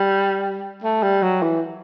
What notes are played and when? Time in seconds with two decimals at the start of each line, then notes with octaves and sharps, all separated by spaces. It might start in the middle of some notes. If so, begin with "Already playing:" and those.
Already playing: G3
0.84 A3
1.03 G3
1.23 F#3
1.43 E3